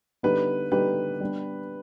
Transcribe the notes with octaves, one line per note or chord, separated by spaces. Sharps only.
D3 G3 B3 D#4 G4 B4
D3 G3 B3 D#4 G4 B4
G3 B3 D4